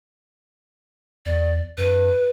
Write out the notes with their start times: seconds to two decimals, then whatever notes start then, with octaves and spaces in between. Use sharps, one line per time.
1.26 E2 D5
1.78 F#2 B4